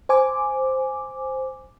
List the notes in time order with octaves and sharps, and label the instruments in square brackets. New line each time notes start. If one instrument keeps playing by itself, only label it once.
[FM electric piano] C5 G#5 D6